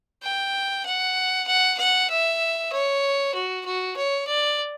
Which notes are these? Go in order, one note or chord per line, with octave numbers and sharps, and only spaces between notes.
G5
F#5
F#5
F#5
E5
C#5
F#4
F#4
C#5
D5